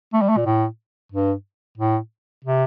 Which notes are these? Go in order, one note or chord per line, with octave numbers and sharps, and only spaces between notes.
A3
G3
A3
A#2
A2
G2
A2
C3